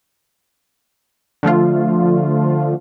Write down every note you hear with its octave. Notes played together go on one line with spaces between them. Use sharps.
D3 F3 A3 F4